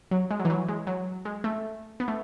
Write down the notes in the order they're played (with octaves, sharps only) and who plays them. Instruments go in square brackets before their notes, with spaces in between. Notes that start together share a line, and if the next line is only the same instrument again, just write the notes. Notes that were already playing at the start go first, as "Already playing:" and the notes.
[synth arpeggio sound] F#3
G#3
F#3
E3
F#3
G#3
F#3
G#3
A3
B3
A3